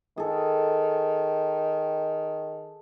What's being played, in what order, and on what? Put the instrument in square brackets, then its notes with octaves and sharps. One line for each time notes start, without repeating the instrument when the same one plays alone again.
[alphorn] D#3 [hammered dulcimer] G#4 A4